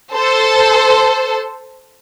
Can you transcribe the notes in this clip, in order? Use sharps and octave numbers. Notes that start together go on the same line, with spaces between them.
A4 C5